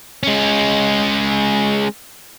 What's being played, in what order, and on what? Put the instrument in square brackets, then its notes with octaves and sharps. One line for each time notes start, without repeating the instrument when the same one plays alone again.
[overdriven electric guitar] G#3 C#4